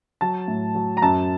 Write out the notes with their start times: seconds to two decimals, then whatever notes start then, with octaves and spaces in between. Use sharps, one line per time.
0.21 F#3 A5
0.48 A2
0.75 F#3
0.97 A#5
1.02 F#2 A5